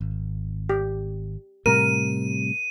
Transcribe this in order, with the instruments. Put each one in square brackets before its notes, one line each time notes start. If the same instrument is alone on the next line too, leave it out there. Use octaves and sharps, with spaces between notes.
[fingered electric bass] G#1
[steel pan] G4
[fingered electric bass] A2 C3 G3 [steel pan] A#4 [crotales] D#7